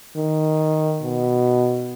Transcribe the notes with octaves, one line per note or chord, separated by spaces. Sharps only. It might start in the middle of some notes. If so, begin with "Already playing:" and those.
D#3
B2